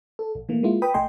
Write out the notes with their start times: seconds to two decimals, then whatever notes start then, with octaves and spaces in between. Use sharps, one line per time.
0.19 A4
0.35 A#1
0.49 E3 A3 A#3
0.63 G#3 A#3 E4 F4
0.82 B4 G5 B5 D#6
0.94 A#1 A3 D#5 G5 G#5 C6